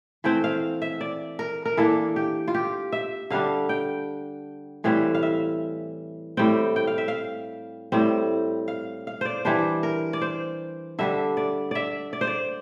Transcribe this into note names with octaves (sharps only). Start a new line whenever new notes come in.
E3 A3 C4 G5
F5
E5
D5
A#4
A#4
E3 A#3 D4 A4
G4
F4
G4
E5
D3 G3 D4 F5
G5
A2 E3 G3 C4 F5
F5
E5
A2 G3 C4 G5
G5
F5
E5
F5
A2 G3 C4
F5
F5
C5 D5
E3 G3 D4 C5
A#4
D5
C5
D3 G3 D4 E5
D5
D5 E5
D5
C5
D5